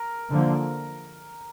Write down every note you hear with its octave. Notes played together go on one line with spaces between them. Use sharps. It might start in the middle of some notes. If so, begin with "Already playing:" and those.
Already playing: A#4
D3 F3 A#3